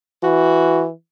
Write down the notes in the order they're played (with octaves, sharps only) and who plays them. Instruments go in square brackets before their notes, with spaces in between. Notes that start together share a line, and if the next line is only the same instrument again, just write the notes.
[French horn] E3 [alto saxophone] F#4